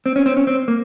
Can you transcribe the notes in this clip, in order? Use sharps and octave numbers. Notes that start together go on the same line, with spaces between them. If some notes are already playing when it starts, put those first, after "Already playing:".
C4
C#4
C4
C#4
C4
A#3